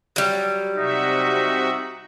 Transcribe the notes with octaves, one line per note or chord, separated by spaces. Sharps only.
F#3 G3
C3 D#4 F#4 E5